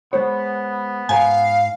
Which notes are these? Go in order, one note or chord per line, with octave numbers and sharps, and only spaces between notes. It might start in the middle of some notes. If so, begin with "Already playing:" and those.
G#3 B3 C5 C#5
G#2 C5 F5 G#5 A#5